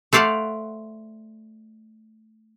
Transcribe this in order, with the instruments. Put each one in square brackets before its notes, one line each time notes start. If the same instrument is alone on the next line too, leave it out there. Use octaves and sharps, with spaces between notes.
[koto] A3 C5 D5 F5 F#5